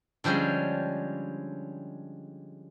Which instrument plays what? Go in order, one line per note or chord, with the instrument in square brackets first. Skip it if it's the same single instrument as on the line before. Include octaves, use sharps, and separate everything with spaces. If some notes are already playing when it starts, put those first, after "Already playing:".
[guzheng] D3 F3 G3 G#3 C#4